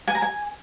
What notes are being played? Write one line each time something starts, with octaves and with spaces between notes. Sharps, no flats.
G#5
A#5
G#5